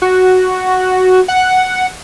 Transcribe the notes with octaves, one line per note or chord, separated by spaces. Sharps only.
F#4
F#5